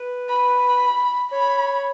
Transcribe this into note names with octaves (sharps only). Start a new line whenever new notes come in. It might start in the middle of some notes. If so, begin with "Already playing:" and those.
Already playing: B4
B5
C#5 B5